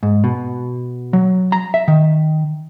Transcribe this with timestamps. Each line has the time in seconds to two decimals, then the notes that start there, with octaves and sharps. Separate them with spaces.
0.03 G#2
0.24 B2
1.13 F#3
1.52 A#5
1.74 E5
1.88 D#3